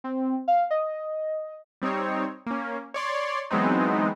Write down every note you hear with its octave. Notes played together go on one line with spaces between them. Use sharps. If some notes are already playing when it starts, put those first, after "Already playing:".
C4
F5
D#5
G3 C4 D#4 C#5
A#3 C#4
C#5 D5 C6
E3 F#3 G#3 B3 C4 D#4